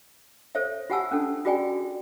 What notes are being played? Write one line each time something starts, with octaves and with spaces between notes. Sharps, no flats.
A4 C5 C#5 E5
F4 G4 F#5 G#5 A5 E6
C#4 D4 A4
F4 F#4 G#4 D5 G5 G#5